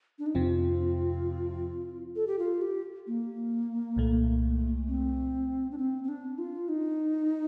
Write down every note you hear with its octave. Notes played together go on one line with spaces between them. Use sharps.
D4
D#4
F2 C3 F3 C4 F4
A4
G4
F4
G4
A#3
C2 A#2 A3
C4
D4
C4
C4
D4
F4
D#4